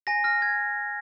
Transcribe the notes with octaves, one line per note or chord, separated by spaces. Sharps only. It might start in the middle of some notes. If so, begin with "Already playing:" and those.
G#5 A#6
F6 A#6
G#5 G#6